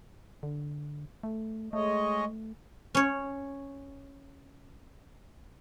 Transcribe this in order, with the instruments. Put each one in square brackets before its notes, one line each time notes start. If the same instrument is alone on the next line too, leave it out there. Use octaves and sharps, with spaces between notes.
[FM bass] D3
A3
[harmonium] G#3 C#5 D#5 [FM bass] A3
[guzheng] C#4 C#5